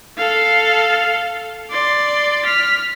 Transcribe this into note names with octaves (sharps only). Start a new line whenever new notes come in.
A4 F5
D5 C6
F6 B6